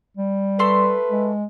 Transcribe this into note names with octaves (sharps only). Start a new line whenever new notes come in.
G3
A3 B4 E5 C6
G#3